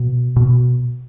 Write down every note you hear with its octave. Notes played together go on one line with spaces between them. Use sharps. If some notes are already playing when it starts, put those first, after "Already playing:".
Already playing: B2
B2